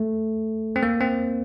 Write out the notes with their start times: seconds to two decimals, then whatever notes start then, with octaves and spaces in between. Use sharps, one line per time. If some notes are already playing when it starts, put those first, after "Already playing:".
Already playing: A3
0.76 C4
0.83 A#3
1.01 C4